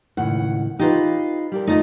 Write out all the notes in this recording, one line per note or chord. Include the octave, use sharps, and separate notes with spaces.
C#2 A2 D#3 F#5
D#4 F4 G4 B4
G3 G4 A#4
A3 D#4 F4 D#5